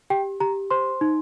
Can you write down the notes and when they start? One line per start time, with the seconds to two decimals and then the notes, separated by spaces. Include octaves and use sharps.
0.10 G4 G5
0.40 G4 A#5
0.71 C5 C6
1.01 D#4